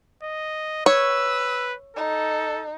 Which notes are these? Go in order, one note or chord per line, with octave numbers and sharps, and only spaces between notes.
D#5
B4 C#5 E6
D#4 A4